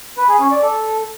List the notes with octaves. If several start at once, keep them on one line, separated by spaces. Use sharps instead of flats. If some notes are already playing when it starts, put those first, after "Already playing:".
B4
G#4
C#4
D5
A4